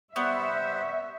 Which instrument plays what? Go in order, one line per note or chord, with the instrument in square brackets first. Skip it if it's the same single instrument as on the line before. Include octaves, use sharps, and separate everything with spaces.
[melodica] G3 C5 F#5 [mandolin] B3 [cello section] E5 [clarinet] C#6